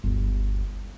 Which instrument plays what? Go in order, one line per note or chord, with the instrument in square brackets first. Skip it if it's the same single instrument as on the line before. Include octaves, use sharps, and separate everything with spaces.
[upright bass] G1 D2